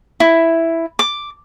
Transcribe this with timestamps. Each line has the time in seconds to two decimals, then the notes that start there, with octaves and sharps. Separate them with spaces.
0.20 E4
0.99 D6